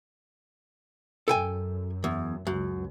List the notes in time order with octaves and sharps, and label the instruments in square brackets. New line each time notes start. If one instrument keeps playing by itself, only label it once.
[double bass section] F#2 [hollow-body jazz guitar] A4 G5 G#5
[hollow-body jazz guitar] E2
[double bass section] C#2 [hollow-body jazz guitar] F#2